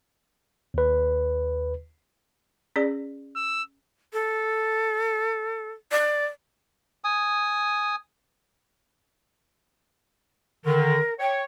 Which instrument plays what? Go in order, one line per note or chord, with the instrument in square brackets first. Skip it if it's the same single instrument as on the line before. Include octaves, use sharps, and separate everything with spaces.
[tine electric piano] D#2 B4
[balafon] C#4 G#4 D5
[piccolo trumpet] E6
[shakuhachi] A4
D5
[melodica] G#5 D#6
[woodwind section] D3 D#3 [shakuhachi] A#4
[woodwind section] C#5 [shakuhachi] G5